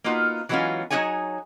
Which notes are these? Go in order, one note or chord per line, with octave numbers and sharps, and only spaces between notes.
A#3 B3 D#4 F4 F#4
E3 F#3 G#3 B3 C#4 F4
F#3 D4 D#4 G#4 C#5 G#5